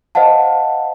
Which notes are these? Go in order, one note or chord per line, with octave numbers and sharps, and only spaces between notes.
C5 D#5 F5 F#5 A5